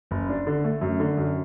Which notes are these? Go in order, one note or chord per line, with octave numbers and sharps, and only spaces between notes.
F#1
D4
D3
A3
F#2
D3
F#2